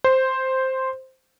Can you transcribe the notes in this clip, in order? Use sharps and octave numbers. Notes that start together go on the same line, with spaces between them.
C5